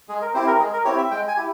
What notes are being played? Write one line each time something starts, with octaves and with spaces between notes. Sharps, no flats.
G#3 G#4
A#4
C4 E4 G4 C5
A#4
G#3 G#4
A#4
C4 E4 G4 C#5
E5
G#3 G5
G#5
E4 G4